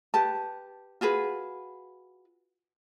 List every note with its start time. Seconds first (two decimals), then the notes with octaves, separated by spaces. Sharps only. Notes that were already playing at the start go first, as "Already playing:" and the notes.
0.14 G4 B4 A5
1.01 F4 F#4 G#4 B4